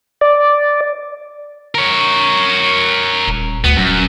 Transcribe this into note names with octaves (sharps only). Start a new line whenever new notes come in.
D5
A#4 C#5
D#1
D2 B3
D#1 F#2